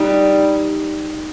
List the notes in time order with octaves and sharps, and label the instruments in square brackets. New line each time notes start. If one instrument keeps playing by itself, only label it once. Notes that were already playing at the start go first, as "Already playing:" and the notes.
Already playing: [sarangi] G3 [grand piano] D#4